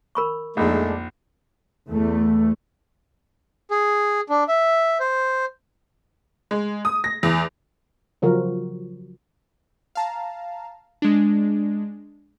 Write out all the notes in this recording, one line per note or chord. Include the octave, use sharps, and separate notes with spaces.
A#4 B5 C#6
A#1 F2 G#3 A3 D4 D#4
E2 A3
G#4
D4
E5
C5
G#3
D#6
A#6
E2
C#3 F3 F#3 F#4 A#4
F5 A5 A#5
G#3 D4